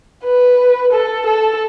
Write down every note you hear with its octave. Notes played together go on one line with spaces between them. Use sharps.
B4
A4
A4